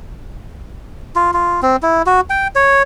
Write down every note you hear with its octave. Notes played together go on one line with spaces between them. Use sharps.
F4
F4
C4
E4
F#4
G5
C#5